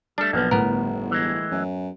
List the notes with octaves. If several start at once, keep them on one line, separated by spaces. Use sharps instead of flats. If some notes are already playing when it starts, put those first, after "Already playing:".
G3 A3 D4 A4
B1 F3 F#3 A#3 B4
G1 D2 A2 B3 A#4
E3 G#3
F#2